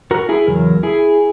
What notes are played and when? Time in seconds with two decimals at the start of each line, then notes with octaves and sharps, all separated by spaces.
0.11 F#4 A#4
0.29 E4 G#4
0.47 E2 C#3 F#3 A#4
0.83 E4 G#4